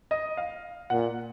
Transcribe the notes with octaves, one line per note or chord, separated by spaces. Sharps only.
D#5
F5
A#2 F#5